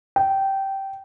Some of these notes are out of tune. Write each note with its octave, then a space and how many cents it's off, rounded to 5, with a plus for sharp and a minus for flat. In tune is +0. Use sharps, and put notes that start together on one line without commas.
G5 -15